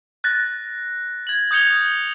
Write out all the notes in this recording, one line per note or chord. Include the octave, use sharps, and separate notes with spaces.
F#6 A6 A#6
G#6 F#7
D#6 G6 G#6 C#7 F7 G7